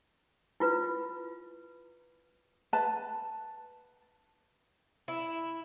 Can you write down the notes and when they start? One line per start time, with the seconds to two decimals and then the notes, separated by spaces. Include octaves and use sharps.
0.60 E4 F4 B4
2.73 B4 A5
5.08 E4